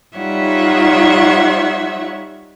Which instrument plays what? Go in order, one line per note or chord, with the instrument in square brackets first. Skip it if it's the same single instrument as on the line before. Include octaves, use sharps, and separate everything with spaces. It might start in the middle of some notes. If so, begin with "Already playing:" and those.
[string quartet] G3 D#4 F4 C#5 E5 F#5